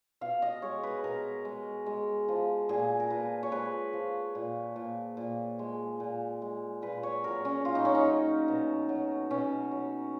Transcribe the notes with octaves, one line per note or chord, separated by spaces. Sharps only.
B2 F5
D#5
G#3 C#5
B4
B2 A#4
G#3
G#3
F3
A#2 G#4
A#4
A#2 B4
C#5
G#3 B4
F3
A#2
A#2
A#2
G#3
A#2
G#3
A#2 B4
C#5
F#3 A#4
C#4
A#2 F4
D#4
C#4
D#4
F#3
B2
F#3
B2 C#4
F#3